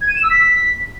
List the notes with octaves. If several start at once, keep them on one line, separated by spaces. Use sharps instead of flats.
G#6
D#7
E7
E6
B6